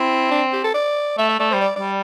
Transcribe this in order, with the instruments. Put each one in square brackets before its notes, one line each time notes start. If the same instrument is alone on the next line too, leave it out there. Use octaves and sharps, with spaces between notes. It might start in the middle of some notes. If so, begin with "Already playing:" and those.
Already playing: [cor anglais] C4 [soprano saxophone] E4
[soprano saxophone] D4
G4
A4
D5
[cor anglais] A3 [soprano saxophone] E5
[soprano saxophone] E5
[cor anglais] A3 [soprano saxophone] D5
[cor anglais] G3 [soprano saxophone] C5
[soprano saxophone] D5
[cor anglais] G3 [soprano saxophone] D5